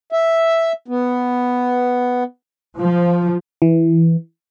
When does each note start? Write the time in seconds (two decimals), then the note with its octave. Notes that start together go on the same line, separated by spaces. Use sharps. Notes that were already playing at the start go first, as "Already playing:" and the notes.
0.12 E5
0.88 B3
2.80 F3
3.62 E3